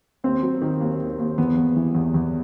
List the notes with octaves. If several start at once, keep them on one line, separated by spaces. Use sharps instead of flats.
D#2 C4
F#3
D#3
D#2
D#2
D#2
E2 B3
E2
E3
E2
E2